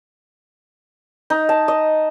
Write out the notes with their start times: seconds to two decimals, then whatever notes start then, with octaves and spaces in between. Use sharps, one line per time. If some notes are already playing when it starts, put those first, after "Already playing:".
1.30 D#4
1.49 A5
1.68 D#5